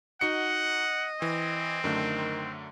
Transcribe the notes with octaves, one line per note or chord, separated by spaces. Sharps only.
D#4 F#4 D#5 F#5 C#7
E3 C4
F#2 D3 D#3 A3